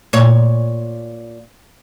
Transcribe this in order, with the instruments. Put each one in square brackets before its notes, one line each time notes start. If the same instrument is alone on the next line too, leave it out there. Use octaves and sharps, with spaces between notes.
[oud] A#2 C#5